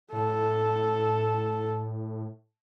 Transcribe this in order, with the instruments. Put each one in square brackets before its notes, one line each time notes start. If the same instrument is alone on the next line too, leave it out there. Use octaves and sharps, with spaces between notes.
[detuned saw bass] A2 [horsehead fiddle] A4